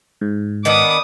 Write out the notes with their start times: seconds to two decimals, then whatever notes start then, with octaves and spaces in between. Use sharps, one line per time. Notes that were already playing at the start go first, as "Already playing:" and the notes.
0.21 G#2
0.65 D#3 B3 D4 D6 D#6